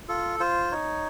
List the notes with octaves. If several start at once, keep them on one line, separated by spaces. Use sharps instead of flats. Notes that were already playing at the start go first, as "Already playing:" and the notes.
F4 A4
F4 C5
D#4 C#5